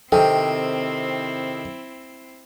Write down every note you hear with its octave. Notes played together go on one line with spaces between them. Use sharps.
C3 D#3 C4 E4 A4 G5